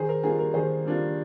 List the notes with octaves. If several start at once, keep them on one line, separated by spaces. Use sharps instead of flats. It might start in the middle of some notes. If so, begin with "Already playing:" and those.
Already playing: D#3 G#4 C5
A#4
G3 A#3 D4 F4 G#4
A#4
D#3 G#4 C5
G3 A#3 D4 F4